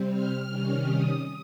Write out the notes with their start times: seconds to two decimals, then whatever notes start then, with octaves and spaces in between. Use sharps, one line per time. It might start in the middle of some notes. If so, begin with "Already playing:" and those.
Already playing: C3 G3 C4
0.09 F6
0.47 C3 D#3 G3 C#4
0.85 D#6